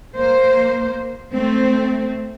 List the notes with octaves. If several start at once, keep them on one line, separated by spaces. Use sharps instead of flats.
A#3 C5
A3 C4